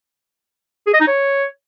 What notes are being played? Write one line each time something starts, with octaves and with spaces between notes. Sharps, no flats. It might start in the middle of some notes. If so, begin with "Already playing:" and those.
G#4
D#5
D#4
C#5